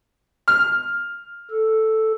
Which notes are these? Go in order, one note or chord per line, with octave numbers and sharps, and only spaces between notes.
F6
A4